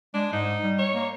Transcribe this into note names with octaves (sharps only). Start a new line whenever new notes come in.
G#3 D4
G#2 D#4
G3
C#5
A#3